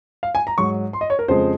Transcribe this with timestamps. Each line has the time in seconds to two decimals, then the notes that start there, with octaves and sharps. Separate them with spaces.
0.23 F5
0.35 G#5
0.47 A#5
0.58 G#2 F#3 C#6
0.93 C6
1.01 D#5
1.10 C#5
1.19 A#4
1.28 F2 C#3 F3 G#3 C5